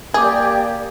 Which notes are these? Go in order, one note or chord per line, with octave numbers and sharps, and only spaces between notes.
A#3 G4 G#4 D5 D6 G#6